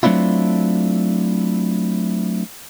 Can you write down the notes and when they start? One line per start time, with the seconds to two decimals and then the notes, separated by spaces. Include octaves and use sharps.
0.03 F#3 A3 C4 D4 E4 F4